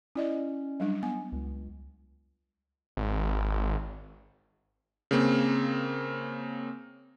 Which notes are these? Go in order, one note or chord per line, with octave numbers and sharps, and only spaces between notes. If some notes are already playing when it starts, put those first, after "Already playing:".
C#4 E4 D5 D#5
F#3 G3 D4
B3 G#5
C#2
G#1
C#3 A#3 C4